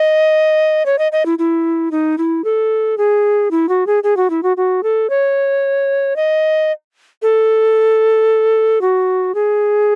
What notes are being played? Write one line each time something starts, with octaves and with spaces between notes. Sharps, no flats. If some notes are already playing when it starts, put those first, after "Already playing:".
Already playing: D#5
C#5
D#5
D#5
E4
E4
D#4
E4
A4
G#4
E4
F#4
G#4
G#4
F#4
E4
F#4
F#4
A4
C#5
D#5
A4
F#4
G#4